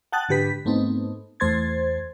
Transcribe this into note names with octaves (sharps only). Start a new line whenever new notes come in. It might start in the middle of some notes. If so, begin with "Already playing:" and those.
F#5 G5 A5 D#6 F#6 A6
G#2 D3 G4 B4 B6
G#2 A3 B3 C4 D#4
E2 A3 C5 C6 G#6 A6